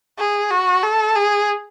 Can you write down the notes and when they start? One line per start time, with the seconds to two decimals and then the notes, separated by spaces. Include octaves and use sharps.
0.18 G#4
0.51 F#4
0.83 A4
1.16 G#4